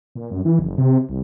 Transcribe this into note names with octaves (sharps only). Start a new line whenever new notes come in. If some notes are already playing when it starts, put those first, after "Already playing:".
A#2
F#2
E3
F#1
C3
C2